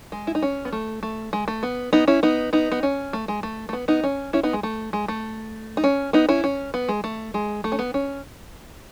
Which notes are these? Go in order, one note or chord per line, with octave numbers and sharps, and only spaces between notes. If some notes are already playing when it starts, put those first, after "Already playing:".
G#3
E4
D#4
C#4
B3
A3
A3
G#3
A3
B3
B3 D#4
C#4 E4
B3 D#4
B3 D#4
B3
C#4
A3
G#3
A3
A3
B3
B3 D#4
C#4
C#4 E4
B3 D#4
G#3
A3
G#3
A3
D#4
C#4
B3 D#4
C#4 E4
C#4
B3
G#3
A3
G#3
A3
C#4
B3
C#4